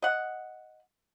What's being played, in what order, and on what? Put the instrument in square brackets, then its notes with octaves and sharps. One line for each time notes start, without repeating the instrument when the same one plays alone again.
[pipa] D#5 F#5